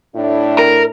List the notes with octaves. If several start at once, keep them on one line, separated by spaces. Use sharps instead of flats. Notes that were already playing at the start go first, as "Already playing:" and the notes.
A2 D4 E4
A#4